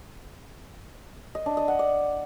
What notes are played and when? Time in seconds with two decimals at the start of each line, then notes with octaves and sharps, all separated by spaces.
1.35 D#5
1.46 D4
1.57 D#5
1.68 F#5
1.79 D5